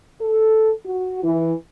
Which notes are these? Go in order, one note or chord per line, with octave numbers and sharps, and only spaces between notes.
A4
F#4
E3